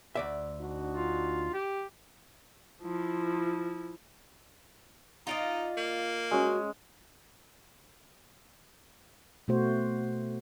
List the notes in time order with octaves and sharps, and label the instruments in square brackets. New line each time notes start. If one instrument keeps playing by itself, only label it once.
[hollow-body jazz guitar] D2 D5 E5
[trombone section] D4 D#4 F#4
[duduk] F4
G4
[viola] F3 E4
[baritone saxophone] D#4 [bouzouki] F4 D5 D#5
[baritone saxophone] A#3
[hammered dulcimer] G#3 C#4 [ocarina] F#4
[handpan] B2 A3 F#4 C5